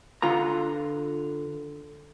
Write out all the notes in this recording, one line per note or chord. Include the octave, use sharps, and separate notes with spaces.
D3 F4 B4 A#5